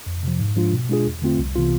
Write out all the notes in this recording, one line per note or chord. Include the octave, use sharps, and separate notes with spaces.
F2
C3 F3
G#2
F3 G#3 D4 F4
B2
G#3 D4 F4 G#4
E2
D3 A3 C4 F4
C2
C3 E3 B3 F4